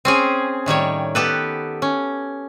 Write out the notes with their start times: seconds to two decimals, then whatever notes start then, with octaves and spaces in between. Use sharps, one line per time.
0.05 C4 C#4 G#4
0.66 A2 D#3 G3 C#5
1.15 B3 G4 A4 B4
1.82 C#4